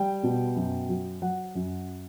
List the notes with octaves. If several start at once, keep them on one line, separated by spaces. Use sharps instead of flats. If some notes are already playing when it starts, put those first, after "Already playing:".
Already playing: G3 G5
B2
F#2
F#3
F#3 F#5
F#2